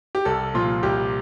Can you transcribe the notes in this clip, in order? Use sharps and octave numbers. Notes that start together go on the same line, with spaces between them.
G4
C2 A4
A#2 F3 F4
C2 G4